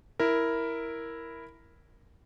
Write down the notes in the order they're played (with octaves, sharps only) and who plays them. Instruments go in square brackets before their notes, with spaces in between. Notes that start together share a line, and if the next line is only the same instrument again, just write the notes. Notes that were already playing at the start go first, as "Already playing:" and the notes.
[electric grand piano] E4 A#4